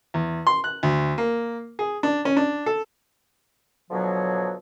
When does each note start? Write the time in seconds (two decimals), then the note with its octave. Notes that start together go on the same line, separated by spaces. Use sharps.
0.14 E2
0.47 C6
0.64 F#6
0.83 D2
1.18 A#3
1.79 G#4
2.03 D4
2.25 C#4
2.37 D4
2.66 A4
3.91 B2 D3 F3 F#3